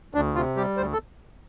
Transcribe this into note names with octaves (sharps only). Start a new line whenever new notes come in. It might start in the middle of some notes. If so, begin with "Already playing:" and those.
D2 D4
C3 F4
G3 G4
D2 C5
A4